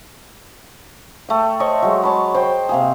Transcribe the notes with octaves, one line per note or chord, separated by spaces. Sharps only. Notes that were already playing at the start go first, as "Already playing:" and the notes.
A3 G5
C5 C#5 D#5 C#6
F#3 G#3
C#5 A5 B5
C5 G5
C3 A#3 G#4